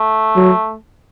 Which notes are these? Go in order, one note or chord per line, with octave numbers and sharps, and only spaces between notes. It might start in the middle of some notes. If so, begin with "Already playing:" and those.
Already playing: A3
F#3